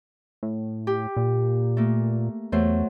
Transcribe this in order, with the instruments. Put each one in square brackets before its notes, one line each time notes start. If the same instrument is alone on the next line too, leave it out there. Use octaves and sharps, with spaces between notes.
[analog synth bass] A2
[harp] G4
[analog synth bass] A#2
[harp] A3 A#3
[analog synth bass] E2 [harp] F#3 A3 C5